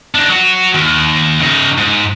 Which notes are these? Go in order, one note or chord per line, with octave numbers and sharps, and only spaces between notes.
D4 D#4
F#3 F#4
D#2
C#3 D#4
G#2